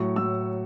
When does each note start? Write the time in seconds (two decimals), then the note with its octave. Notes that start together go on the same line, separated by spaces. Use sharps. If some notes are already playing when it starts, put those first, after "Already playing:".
Already playing: A2 F#3 C#6
0.16 A2 F#3 E6